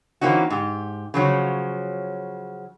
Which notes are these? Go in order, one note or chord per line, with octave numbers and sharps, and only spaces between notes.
E3 A#3 C4 C#4 D#4 F#4
G#2 G4
C#3 F3 F#3 C#5